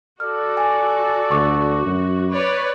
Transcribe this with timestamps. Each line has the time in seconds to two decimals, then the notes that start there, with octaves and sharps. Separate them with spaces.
0.20 F#4 A4 D5 F6
0.57 G#5
1.31 D2 C#6 D6
1.86 F#2
2.32 B4 C#5 D5